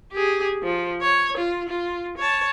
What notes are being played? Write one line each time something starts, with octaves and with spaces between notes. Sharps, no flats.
G4 G#4
F3
C#5
F4
F4
C#5 A5